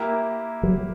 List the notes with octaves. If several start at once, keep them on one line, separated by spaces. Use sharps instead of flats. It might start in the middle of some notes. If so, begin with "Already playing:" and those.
Already playing: A#3 E4 G4 A#4
F#3